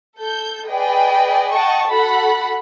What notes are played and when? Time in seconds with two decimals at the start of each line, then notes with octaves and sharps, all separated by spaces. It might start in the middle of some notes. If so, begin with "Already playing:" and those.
0.18 A4 G6
0.68 G#4 B4 D5 D#5 G5
1.53 D#5 F#5 G5 A5 C#6
1.89 F#4 A4 F#5 B5